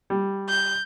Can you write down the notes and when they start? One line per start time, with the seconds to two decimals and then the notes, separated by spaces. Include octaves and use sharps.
0.10 G3
0.49 G6